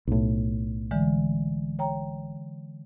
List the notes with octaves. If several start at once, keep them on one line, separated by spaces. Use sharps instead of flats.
B1 A2
D3 E3 G#3
C#5 G5 A#5